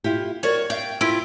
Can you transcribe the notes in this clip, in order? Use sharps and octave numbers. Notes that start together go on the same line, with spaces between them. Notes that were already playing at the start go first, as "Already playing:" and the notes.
E4 F4 G4
F#4 A#4 C#5 D5
E5 F5 G5
E4 F4 G4